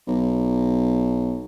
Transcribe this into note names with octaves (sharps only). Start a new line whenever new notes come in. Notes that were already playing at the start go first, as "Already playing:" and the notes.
B1